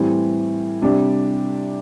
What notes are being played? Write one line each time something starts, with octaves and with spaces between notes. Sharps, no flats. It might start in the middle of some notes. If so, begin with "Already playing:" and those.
Already playing: A2 E3 G3 C4
C3 G3 D4 G4 D5